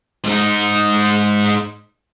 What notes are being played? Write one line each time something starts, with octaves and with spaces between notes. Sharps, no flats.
G#2 D#4